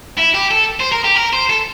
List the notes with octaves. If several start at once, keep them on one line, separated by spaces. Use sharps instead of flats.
E4
G4
A4
C5
A#4
G4
A#4
C5
A4